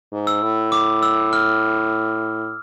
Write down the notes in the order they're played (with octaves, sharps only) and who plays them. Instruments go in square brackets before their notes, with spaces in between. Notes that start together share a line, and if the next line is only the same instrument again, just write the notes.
[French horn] G#2
[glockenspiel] E6
[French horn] A2
[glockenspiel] D6
E6
F6